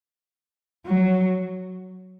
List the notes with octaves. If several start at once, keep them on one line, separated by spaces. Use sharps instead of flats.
F#3